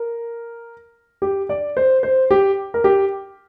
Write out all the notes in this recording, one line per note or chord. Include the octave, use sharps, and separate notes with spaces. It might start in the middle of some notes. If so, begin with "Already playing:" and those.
Already playing: A#4
G4
D5
C5
C5
G4
A#4
G4